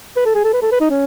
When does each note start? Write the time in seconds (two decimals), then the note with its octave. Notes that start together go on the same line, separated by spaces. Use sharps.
0.16 B4
0.26 A4
0.35 G#4
0.44 A4
0.53 B4
0.62 A4
0.72 B4
0.81 D#4
0.90 C#4